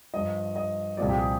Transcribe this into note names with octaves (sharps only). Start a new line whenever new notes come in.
G2 F3 D#5
D#5
C2 A#2 F3 D5
G4
G#4